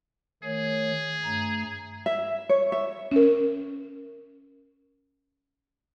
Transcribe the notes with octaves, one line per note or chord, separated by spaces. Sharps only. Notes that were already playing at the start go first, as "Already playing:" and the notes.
D#3 A3 G#4 C#5
G2 A3 A#5
E5
C#5
E5
C#4 A#4